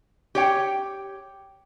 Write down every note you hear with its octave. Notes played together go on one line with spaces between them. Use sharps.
G4 C#5 G5